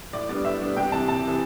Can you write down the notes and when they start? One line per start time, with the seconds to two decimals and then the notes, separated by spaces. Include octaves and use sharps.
0.13 A2 D5
0.29 G3 B3 D4 D5
0.45 A2 E5
0.61 G3 B3 D4
0.77 C2 G5
0.92 C3 E3 A5
1.08 C2 A5
1.24 C3 E3